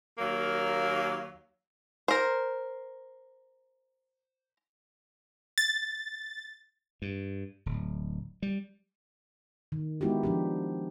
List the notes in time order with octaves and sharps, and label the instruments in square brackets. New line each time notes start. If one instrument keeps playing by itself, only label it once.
[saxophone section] D#2 F#3 A#3 F5
[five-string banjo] A#4 C5
[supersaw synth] A6
[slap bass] G2
D1
G3
[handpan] D#3
G#3 B3 D#4 E4 F#4 G4
F3 D4 G4